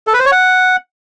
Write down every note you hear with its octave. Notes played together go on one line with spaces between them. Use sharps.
A4
B4
C5
C#5
F#5